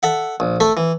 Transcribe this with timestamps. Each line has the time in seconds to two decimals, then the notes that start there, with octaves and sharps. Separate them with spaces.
0.03 A4 E5 F#5
0.40 A#1
0.60 A3 A4 E5
0.77 E3